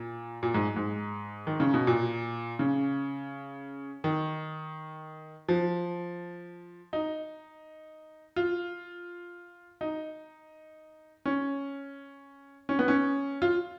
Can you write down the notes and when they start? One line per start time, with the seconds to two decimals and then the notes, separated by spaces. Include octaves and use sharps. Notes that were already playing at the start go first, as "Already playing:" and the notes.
Already playing: A#2
0.43 A#2
0.54 G#2
0.76 G#2
1.47 D#3
1.60 C#3
1.74 B2
1.87 A#2
2.59 C#3
4.04 D#3
5.48 F3
6.93 D#4
8.36 F4
9.81 D#4
11.25 C#4
12.69 C#4
12.79 B3
12.88 C#4
13.42 F4